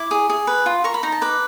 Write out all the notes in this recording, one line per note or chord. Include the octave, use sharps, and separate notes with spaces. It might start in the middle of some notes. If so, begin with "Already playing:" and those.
Already playing: E4 D6
G#4
G#4
B4
F4
A#4 C#6
B5
D#4 A#5
A5
B4 D6